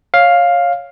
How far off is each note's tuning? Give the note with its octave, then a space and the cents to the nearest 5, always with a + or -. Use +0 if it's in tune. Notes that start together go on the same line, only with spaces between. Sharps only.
C#5 +0 F5 +5